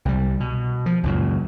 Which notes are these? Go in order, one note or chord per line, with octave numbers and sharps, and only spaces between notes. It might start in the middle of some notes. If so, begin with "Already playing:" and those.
C2 G3
B2
F3
C#2 F#2 A#2